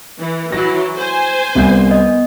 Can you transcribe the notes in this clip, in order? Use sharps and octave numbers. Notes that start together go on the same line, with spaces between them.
E3
E3 F#3 E4 A#6
C5 G#5
C2 G3 B3 G6
D#5